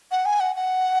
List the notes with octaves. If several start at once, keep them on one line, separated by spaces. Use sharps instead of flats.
F#5
G#5
F#5
F#5